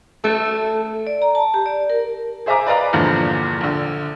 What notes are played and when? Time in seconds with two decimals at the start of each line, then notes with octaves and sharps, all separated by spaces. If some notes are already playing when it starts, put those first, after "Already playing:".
0.24 A3 A4
1.07 D5
1.22 A#5
1.35 A5
1.54 G4
1.66 D5
1.90 A#4
2.46 G#4 C5 E5 G#5 A#5 D6
2.67 B4 D5 D#5 F5 A#5 B5
2.93 E2 G2 A#2 D3 F3
3.61 A#1 D3